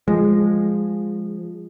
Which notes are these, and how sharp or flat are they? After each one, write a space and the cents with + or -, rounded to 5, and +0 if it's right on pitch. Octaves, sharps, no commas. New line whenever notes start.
F3 +0 G#3 -10